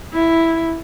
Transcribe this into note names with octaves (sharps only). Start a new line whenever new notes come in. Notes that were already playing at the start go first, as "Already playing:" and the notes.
E4